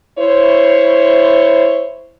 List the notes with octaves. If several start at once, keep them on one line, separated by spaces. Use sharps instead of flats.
E4 C5 C#5